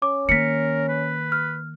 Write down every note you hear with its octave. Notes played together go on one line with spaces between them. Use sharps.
C#4 D6
D#3 A#3 A#4 B6 C#7
B4
F6